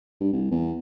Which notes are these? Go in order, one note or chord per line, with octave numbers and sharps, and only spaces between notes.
G2
C2
E2